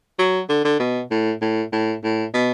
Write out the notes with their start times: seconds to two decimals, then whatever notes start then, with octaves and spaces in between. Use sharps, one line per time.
0.19 F#3
0.49 D3
0.65 D3
0.80 B2
1.11 A2
1.41 A2
1.72 A2
2.04 A2
2.34 B2